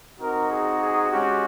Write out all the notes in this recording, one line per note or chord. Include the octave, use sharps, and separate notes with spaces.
C4 D#4 F#4 A#4
G#4
G#4
G#3 C#4 F#4 G4